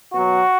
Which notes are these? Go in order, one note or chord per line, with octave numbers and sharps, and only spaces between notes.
B2 F#3 F#4